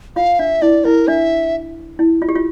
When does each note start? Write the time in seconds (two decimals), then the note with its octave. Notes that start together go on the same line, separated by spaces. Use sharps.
0.16 F4 F5
0.39 D4 E5
0.62 E4 D5
0.84 E4 A#4
1.08 D4 E5
1.99 E4
2.22 F4
2.29 G4
2.36 F4